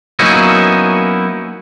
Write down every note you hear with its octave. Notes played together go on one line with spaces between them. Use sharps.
F#3 A#3 B3 C#4 D#4 E4